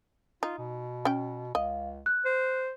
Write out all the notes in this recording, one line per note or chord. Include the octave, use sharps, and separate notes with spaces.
D#4 F4
B2
C#4 G5
C#2 D#5 F5
F#6
C5